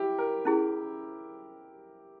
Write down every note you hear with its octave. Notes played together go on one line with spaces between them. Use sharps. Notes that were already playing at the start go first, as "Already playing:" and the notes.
Already playing: E4 G4
A#4
C#4 E4 G#4